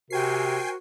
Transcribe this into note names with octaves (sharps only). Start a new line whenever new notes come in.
C3 F#4 A#4 C5 G5 G#5 C7